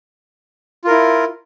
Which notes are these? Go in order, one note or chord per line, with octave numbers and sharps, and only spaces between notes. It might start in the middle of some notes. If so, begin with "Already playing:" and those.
E4 F4 A#4